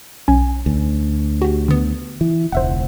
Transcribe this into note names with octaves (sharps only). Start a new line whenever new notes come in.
B1 C#4 G#5
D2
F#4 G4
D3 B3
E3
E1 C#2 C5 E5 F#5